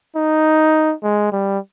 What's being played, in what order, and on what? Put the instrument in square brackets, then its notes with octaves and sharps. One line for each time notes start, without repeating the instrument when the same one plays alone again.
[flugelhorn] D#4
G#3
G3